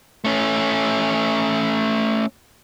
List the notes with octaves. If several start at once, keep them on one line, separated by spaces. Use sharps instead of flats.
A3 C#4